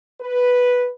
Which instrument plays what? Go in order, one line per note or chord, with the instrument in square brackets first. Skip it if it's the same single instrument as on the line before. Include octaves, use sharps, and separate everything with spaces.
[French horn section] B4